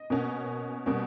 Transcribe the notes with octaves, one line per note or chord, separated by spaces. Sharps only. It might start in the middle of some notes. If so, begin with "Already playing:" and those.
Already playing: D#5
B2 A#3 C#4
B2 G3 A#3 C#4